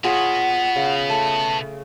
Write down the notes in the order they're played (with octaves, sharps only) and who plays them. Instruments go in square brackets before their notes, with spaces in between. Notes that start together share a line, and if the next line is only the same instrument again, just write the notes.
[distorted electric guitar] B2 B3 [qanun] F4 G#4 C#5 [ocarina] F#5
[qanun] C#3
[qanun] A3 [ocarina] A5